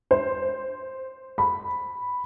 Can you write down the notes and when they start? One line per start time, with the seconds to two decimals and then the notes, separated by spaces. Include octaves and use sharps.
0.11 C5
1.38 B5